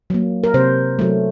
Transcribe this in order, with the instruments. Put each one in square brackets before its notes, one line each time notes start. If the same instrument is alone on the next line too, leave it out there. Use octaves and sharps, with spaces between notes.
[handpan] F#3 A#3
A#4
C3 C5
F#3 A3